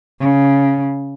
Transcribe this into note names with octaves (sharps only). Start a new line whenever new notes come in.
C#3